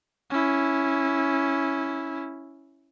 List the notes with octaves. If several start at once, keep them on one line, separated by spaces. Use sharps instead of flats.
C#4 E4